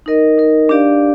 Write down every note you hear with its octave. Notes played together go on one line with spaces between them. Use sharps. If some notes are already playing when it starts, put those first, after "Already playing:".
D#4 A#4 D#5
D#4 A#4 D#5
D4 G4 D5 F5